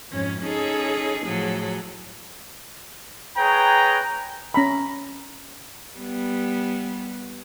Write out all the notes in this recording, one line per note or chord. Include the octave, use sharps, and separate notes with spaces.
F2 G#2 C#4
C#4 D#4 G#4 A4
A2 F3 F#3 G#4 A4
G#4 B4 C#5 G5 A#5
C#4 A#5 B5
G3 B3